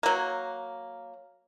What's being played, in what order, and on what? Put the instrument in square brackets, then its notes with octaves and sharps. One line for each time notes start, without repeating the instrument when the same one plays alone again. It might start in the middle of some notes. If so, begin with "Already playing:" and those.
[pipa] F#3 A#3